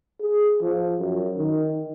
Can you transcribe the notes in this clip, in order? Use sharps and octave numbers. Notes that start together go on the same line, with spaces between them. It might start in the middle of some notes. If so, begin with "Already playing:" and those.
G#4
F3
F#2
D#3